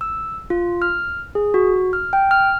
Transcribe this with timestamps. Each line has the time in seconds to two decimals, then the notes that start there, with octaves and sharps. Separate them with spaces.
0.01 E6
0.50 F4
0.82 F6
1.35 G#4
1.54 F#4
1.93 F6
2.13 G5
2.31 F6